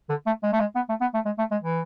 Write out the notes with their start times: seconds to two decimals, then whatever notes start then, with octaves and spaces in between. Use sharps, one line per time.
0.09 D3
0.26 A3
0.43 G#3
0.53 A3
0.60 G#3
0.75 B3
0.89 A3
1.01 B3
1.14 A3
1.25 G#3
1.38 A3
1.51 G#3
1.63 E3